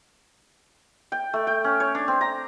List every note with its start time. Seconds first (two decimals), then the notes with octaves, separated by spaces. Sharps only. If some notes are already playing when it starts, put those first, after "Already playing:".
1.12 G5
1.33 A3
1.47 G5
1.64 C#4
1.80 C#5
1.95 D4
2.08 C4
2.21 A#5